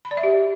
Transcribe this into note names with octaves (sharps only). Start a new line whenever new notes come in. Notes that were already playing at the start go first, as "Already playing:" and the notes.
B5
D5
E5
G4